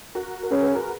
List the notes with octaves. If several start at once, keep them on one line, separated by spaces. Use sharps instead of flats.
F#4 A#4
A#4
C#4 G#4 B4
G#4 B4
F#4 A#4